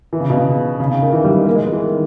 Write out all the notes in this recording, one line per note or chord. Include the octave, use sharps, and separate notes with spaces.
E3
C#3
B2
C#3
C#3
C#3
D#3
E3
G3
G#3
A#3
G#3
B3
E3
D#3